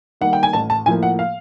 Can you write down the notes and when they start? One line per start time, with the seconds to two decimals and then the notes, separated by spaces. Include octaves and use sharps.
0.21 D#3 G3 A#3 F#5
0.33 G5
0.43 G#5
0.53 A1 A5
0.70 A5
0.86 A2 F3 A#3 G#5
1.03 F#5
1.19 F5